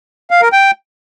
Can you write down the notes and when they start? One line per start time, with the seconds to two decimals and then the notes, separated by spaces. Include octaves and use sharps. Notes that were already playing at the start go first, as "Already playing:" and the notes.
0.31 F5
0.42 A#4
0.53 G5